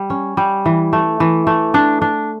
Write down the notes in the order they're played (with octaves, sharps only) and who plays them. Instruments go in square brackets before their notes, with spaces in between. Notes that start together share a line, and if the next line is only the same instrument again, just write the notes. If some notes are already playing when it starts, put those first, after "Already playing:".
Already playing: [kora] G3
C#4
G3
E3
A3
E3
A3
D4
D4